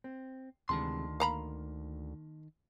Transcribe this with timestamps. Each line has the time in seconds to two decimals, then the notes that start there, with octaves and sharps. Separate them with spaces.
0.04 C4
0.69 D2 C3 D#3 E3 G#3 A5 C6
1.20 A#3 F5 A#5 B5